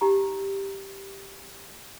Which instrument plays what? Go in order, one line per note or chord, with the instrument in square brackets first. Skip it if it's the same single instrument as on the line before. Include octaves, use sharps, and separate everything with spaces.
[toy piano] D#4 G4 A#5